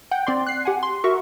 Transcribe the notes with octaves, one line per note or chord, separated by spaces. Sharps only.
F#5 G5 G6
C4 D5 C6
F#6 C7
G4 F#5 G#5
C6
F#4 A#4 E5 C#6